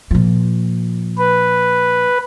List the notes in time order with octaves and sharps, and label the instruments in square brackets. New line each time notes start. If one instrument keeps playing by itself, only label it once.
[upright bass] A#2 F3
[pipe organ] B4